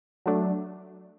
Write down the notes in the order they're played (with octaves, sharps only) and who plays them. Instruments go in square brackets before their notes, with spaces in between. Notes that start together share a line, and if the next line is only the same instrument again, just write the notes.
[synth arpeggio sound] F#3 A3 D4